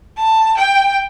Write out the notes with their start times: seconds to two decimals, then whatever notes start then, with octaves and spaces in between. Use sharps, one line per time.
0.17 A5
0.57 G5